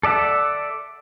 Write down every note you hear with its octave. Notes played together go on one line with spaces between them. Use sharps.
A4 D5 E5 F#5